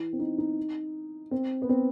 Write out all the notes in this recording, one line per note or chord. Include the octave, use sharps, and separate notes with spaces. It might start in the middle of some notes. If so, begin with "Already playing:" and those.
Already playing: E3
C4
D#4
D#4
C4
B3
C4